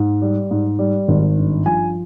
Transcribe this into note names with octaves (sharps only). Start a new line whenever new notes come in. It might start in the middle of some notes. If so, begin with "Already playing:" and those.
Already playing: G#2
G3
G#2
G3
G#1
G2
F3 G#5